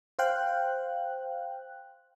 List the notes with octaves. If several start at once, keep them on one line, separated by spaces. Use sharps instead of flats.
C5 F5 G5 F#6